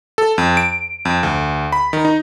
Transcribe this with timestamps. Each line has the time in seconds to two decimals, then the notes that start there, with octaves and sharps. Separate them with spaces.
0.18 A4
0.38 F2
0.57 D7
1.05 F2
1.23 D2
1.72 B5
1.93 D#3
2.05 D#4